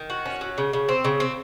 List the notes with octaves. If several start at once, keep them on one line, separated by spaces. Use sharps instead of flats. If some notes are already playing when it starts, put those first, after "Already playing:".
Already playing: D#3
F#4
C#4
F#3
C#3
C#3
C4
C#3
C4